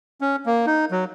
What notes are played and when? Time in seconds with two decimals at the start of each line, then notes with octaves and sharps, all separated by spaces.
0.21 C#4
0.46 A#3
0.66 D#4
0.91 F#3